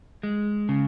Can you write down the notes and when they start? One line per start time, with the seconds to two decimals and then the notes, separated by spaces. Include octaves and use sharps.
0.23 G#3
0.69 C#3